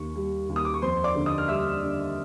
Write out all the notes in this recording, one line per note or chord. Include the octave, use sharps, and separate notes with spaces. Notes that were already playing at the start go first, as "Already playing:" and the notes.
Already playing: D#2 C#6
G3
D#2
D#6
D6
C#6
F2 C5 C6
D5 D6
D3
D#5 D#6
F6
G3 E5 E6
D3